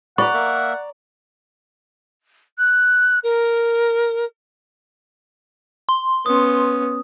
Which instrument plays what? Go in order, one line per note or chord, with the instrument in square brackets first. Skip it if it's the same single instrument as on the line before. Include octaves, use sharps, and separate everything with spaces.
[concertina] B4 B5 [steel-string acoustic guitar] D5 A#5 [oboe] F#5 [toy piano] C#6
[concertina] A#3 A#4 E5
[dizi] F#6
A#4
[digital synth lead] C6
[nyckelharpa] B3 C#4 [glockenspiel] D#6